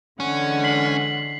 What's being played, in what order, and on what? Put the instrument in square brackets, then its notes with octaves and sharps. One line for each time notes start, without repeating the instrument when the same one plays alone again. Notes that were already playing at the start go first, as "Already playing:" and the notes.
[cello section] D3 E3 G#3 [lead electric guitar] C#4 [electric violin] F#5
[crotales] B6 C7 F#7